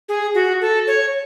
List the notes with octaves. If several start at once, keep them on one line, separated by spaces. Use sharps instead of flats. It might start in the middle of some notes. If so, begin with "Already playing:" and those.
G#4
F#4
A4
C#5